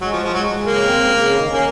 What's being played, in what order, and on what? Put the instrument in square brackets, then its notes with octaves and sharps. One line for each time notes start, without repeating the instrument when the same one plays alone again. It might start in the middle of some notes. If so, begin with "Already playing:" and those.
[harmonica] F#3 [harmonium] G#3
[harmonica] F3
[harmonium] G#3
[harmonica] F3
[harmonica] F#3 [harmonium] G#3
[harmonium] G#3
[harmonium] C#3 [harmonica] A#3
[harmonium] C4
C#3
C#3
D#3
[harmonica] A#3 [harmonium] C#4